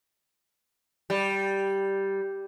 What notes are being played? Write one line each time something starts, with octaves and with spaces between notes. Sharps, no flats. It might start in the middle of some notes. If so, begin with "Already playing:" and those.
G3